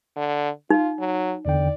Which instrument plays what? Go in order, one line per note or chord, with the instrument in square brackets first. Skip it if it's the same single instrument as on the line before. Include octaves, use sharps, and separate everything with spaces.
[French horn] D3
[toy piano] D#4 [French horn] F4
[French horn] F#3
[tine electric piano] E2 D3 G5 [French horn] D5